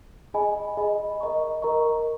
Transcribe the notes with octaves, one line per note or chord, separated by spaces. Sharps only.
G#4 D#5 G#5 B5
G#4 D#5 G#5 B5
A#4 D#5 A#5 C#6
A#4 D#5 A#5 C#6